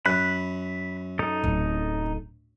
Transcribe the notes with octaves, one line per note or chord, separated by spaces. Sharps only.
F#2 B5 F#6
D#4 A4 D#6
D1